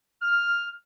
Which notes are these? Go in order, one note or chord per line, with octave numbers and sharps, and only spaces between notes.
F6